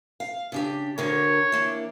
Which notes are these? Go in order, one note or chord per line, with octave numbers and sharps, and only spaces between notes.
F5
C#3 D4 G4
D2 D3 A#4 C#5
E3 A#3 D4